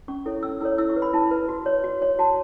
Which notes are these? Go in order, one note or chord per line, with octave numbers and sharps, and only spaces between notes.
C#4 C#6
E4 A4 C#5
C#4 E6
E4 A4 C#5 E6
E4 E6
C#6
B4
B5
E4 A5
B4
F#4
C#5
F#4
C#5
F#4 A5